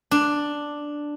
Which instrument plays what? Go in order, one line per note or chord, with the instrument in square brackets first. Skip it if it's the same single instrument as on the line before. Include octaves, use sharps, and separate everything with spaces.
[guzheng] D4